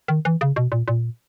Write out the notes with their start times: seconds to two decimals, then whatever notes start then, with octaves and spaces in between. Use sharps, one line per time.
0.08 D#3
0.25 E3
0.41 C#3
0.56 B2
0.72 A#2
0.88 A#2